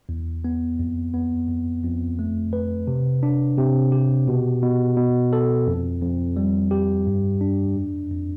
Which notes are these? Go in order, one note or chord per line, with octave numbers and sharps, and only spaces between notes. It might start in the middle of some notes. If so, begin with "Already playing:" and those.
E2
B3
F2
B3
F2
F2
A3
B4
C3
D4
C3
G4
B2
B2
B2
A4
F2
F2
G3
G4
G2
D4
F2
F2